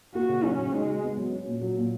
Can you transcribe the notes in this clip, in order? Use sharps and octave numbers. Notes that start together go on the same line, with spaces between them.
A#3 F#4
C#3
F#3 C#4
C#3
G#3 D#4
F#4
B3
F#3
C#4
A#2
F#3
A#2